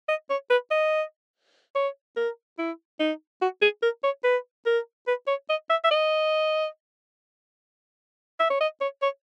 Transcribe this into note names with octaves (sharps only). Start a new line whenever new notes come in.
D#5
C#5
B4
D#5
C#5
A#4
E4
D#4
F#4
G#4
A#4
C#5
B4
A#4
B4
C#5
D#5
E5
E5
D#5
E5
C#5
D#5
C#5
C#5